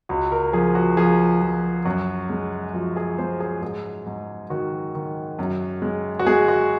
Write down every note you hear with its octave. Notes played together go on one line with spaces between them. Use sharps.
C#2 F#4
A#4
F3 G#4
F#4
F3 G#4
F3
F#2 F#4
G#3
F3 F#4
G#4
G#3 C5
G#4
G#2 G#4
G#2
D#3 F#4
D#3
F#2
G#3
F#4
G#3 G#4
F#4